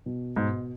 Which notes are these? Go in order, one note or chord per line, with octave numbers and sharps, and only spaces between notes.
B2
G#2 B2